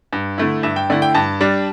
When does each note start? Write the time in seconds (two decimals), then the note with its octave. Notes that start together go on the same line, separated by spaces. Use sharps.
0.13 G2
0.38 D3 A3 E4
0.63 G2 E5
0.76 G5
0.90 D3 A3 E4 D5
1.02 G5
1.14 G2 A5
1.41 G3 D4